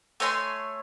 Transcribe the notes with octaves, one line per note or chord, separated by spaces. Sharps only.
A3 C#5 G#5 C6